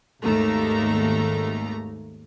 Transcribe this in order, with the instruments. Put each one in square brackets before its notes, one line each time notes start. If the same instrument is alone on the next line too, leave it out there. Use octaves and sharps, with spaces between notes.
[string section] G#1 D#2 A3 A#5